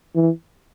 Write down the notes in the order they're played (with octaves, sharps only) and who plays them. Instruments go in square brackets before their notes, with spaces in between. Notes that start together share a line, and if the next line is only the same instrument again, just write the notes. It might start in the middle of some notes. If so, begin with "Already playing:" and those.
[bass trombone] E3